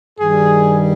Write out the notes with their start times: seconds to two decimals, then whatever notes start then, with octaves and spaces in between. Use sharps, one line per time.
0.18 G2 D#3 G3 G#4